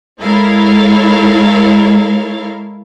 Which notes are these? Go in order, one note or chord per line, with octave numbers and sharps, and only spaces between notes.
G#3 E4 A4 A#4 C#5 F5